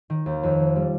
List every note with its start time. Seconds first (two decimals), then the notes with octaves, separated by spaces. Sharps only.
0.10 D#3
0.26 D#2
0.43 F2
0.60 F1
0.76 G3